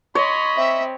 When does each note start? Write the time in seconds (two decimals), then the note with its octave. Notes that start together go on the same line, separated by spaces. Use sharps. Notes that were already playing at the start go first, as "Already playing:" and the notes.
0.15 C#5 D#5 B5 C6
0.57 C4 E5